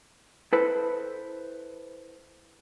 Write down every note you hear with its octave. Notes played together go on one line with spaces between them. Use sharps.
E4 A4 B4 C5